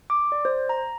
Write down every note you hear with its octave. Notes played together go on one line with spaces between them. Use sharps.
D6
D5
C5
A#5